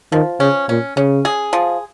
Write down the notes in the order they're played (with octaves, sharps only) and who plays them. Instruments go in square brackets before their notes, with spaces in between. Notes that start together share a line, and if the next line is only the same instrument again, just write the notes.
[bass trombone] D#3 [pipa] F3
[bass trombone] C#3 [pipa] C#4
[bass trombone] A#2 [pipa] C#4
[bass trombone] C#3 [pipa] C#4
[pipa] G#4
F3